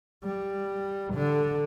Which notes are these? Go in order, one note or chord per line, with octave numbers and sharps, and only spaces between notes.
G3
D3